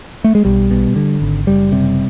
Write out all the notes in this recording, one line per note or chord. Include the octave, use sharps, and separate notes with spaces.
A3
G#3
B1 G3
B2
D3
G#1
F#1 G3
C3